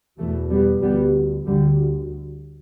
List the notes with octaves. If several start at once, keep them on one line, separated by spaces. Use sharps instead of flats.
E2 B2 E3 A3
G3 B3
D2 G3 B3
D2 D3 G3